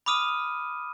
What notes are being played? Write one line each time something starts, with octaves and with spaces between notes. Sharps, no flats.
B5 D6 D#6 F6 D#7